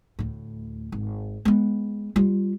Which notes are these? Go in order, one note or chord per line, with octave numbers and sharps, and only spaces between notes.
D2 A2
G#1
G#3 B3
G3 F4